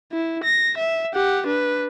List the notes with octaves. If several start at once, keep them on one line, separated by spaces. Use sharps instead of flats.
E4
A#6
E5
G4 F#5
D4 B4